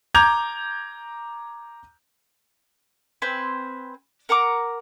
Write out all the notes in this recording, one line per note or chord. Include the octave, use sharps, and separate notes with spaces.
A#5 D6 G6 G#6 F7
C4 B4 C5 G#5
A#4 F#5 A#5 D6